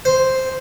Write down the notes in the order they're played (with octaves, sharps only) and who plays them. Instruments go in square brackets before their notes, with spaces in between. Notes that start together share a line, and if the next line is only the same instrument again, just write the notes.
[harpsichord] C5